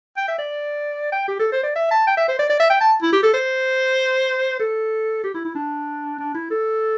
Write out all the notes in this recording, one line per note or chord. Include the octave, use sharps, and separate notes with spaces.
G5
E5
D5
G5
G4
A4
C5
D5
E5
A5
G5
E5
C5
D5
D5
E5
G5
A5
E4
G4
A4
C5
A4
G4
E4
E4
D4
D4
E4
A4